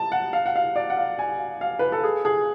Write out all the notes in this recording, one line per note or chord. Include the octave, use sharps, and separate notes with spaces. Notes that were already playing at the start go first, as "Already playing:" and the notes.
Already playing: A5
F#5
F5
F#5
F5
D5
F#5
F5
G#5
F5
B4
A4
G#4
G#4